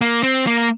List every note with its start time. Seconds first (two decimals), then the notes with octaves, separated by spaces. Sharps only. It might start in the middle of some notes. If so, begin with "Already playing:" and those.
0.01 A#3
0.23 C4
0.47 A#3